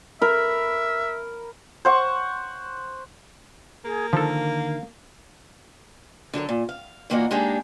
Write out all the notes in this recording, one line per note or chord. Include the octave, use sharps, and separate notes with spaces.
A#4 E5 B5
C5 F#5 C#6
A#3 G#4
D3 D#3 F3 A4 F5
D3 F#3 A4 A#4
A#2
F5
A#2 E3 A#3 B3 D#4 F#4
G#3 A#3 D4 D#4 G4 G#4